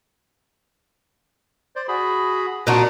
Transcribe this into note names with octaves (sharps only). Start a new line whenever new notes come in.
C5 D5
F#4 G#4 B5
A#2 D4 F#4 D#5